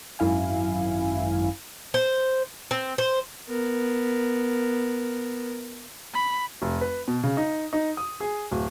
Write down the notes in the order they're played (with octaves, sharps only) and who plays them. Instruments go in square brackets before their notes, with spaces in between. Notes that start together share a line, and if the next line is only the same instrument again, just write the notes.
[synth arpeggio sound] G#1 F#2 E4 F5 G#5
[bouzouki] C5
C4
C5
[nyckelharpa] B3 A#4
[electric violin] B5
[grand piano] F1
B4
B2
C#3
D#4
D#4
D#6
G#4
D1